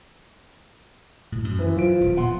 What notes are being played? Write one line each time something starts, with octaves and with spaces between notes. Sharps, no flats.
A2
F#2
E3 E4 B4
F3 F#3 D7
D#1
A#2 F3 B3 F#5 C6